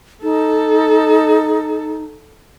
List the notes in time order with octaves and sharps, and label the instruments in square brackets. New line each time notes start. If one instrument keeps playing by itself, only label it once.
[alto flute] D#4 [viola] A4